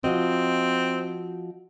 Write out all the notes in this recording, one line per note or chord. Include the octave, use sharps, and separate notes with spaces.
F3 C4 F#4 D#5